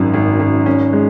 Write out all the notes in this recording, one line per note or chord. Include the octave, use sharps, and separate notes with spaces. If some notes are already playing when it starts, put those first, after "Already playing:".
Already playing: G#1 F#2
G#1
G#1
C#4
G#3